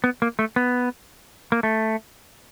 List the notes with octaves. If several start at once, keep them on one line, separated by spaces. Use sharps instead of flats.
B3
A#3
A3
B3
A#3
A3